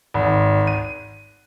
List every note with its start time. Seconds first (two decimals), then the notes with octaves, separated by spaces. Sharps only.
0.14 G#1
0.67 D#7